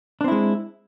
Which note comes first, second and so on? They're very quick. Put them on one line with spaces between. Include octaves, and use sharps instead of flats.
D4 C4 E4 G#3